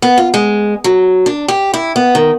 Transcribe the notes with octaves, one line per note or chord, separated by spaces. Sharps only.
B3
F4
G#3
F#3
D4
G4
E4
B3
D#3